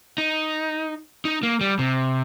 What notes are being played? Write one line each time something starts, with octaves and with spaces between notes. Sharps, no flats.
D#4
D#4
A#3
G3
C3